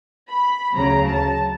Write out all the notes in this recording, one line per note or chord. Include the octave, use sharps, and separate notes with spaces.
B5
D2 C#3 F#3 A#5
A5